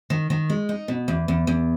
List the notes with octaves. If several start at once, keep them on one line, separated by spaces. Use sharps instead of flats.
D#3
D#3
G#3
D#4
B2
E2
E2
E2